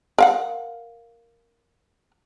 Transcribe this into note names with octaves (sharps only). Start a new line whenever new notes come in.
A#4 F5 F#5